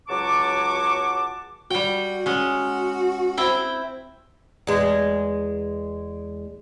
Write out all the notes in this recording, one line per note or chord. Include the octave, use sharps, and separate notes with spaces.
C#2 F#3 F#5 A5 C#6 D6
G3 F#4 G5
G#3 C#4 F#4
C4 E4 G5
E2 G#3